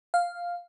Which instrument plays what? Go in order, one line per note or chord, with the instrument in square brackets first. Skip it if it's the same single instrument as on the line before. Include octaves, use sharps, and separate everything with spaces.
[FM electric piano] F5